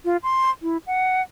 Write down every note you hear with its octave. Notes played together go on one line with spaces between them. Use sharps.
F4
C6
E4
F#5